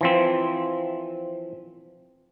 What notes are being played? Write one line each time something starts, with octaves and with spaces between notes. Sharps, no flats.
E3 F3 C4